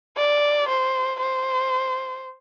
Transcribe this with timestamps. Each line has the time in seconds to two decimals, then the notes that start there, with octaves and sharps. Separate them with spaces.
0.17 D5
0.69 C5
1.20 C5